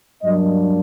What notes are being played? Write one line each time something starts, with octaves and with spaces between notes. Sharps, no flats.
G2 F#3 A#3 D4 D#5